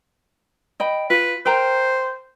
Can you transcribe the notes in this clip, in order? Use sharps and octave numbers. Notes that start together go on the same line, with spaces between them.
D#5 G5 B5
F4 B4
A#4 C5 G5 A#5